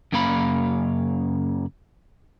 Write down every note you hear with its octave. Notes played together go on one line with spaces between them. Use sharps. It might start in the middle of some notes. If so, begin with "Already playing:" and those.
F#2 C#3 A#3 F5 B5